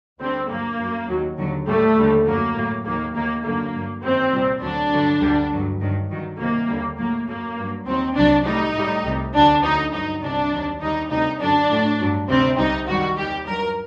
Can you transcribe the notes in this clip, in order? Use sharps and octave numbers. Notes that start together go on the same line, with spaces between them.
D2 D3 G3 C4
G2 F#3 A#3
F#2 F#3
D#2 D#3 F#3
D#2 D3 F#3
A2 G3 A3
D#2 D3 G3
F#2 F#3 A#3
A2 F#3
D#2 D#3 F#3 A#3
D#2 D#3 F#3 A#3
F#2 D3 F#3 A#3
G2 F#3
F#2 D#3 F#3 C4
C2 A#2 G3
D2 D3 F#3 D4
G2 D3 F#3
D2 D3 G3
G2 F#3
G2 D#3 F#3
G2 D#3 F#3
C2 C3 D#3 F#3 A#3
D#2 D3 G3
A2 F#3 A#3
F#2 F#3 A#3
G2 F#3
D#2 D#3 F#3 C4
C2 C3 F#3 D4
A2 G3 D#4
A2 G3
C2 C3 G3
D2 D3 F#3 D4
D2 D3 F#3 D#4
G2 F#3 D#4
C2 C3 F#3 D4
D#2 D#3 F#3
D#2 D#3 G3 D#4
D2 C3 G3 D#4
F#2 D3 F#3 D4
A2 F#3
G2 F#3
D2 C3 G3 C4
C2 C3 G3 D#4
F#2 D#3 G3 F#4
D#2 D#3 G3 G4
G2 F#3 A#4